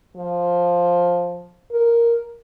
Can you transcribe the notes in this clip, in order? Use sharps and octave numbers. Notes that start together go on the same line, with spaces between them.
F3
A#4